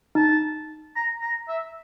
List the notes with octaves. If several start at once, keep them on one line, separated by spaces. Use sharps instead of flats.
D#4 A5
A#5
A#5
E5